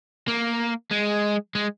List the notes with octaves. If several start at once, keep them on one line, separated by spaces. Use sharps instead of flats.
A#3
G#3
G#3